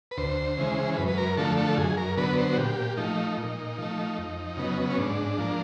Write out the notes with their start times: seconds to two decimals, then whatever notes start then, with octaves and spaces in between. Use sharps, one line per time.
0.11 B4
0.17 D2 C5
0.57 C#3 E3 G#3
0.98 F#2 B4
1.08 B4
1.18 A#4
1.37 D3 F3 A3 A4
1.57 A4
1.77 F#2 G#4
1.97 A#4
2.17 D3 F#3 B3 B4
2.38 C5
2.53 F#4
2.58 A#2 G4
2.97 F3 A3 D#4
3.37 A#2
3.78 F3 A3
4.18 F2
4.57 C#3 F#3 B3
4.90 C#4
4.98 G#2 D4
5.38 F3 A#3